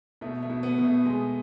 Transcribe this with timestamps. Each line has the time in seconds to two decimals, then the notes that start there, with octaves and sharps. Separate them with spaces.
0.21 B2 A3
0.43 A3
0.50 B2
0.63 B3
0.78 B2
0.84 A3
1.06 B2 G#3